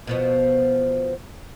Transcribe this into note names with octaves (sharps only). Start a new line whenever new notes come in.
B2 F3 B3